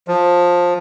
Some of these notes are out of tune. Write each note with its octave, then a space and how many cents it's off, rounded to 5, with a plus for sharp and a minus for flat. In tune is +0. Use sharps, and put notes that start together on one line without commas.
F3 +15